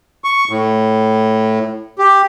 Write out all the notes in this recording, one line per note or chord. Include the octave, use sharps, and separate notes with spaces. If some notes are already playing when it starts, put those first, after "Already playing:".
C#6
A2
G4